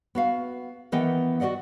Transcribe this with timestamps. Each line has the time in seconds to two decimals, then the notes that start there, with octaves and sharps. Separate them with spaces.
0.15 B3 F#4 F5
0.92 D#3 E3 B3 D#5 F#5 G5
1.40 F#4 G#4 D5 D#5 F#5